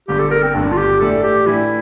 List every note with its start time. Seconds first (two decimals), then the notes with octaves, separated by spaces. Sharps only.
0.08 G1 G2 D3 G4
0.19 A4
0.31 A#4
0.43 C4
0.54 G1 G2 D3 D4
0.72 F4
0.77 G4
1.00 A2 E3 A3 D4 A4
1.23 G4
1.46 A2 E3 A3 D4 E4